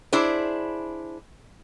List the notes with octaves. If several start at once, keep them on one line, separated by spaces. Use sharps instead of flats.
D4 E4 G#4 C5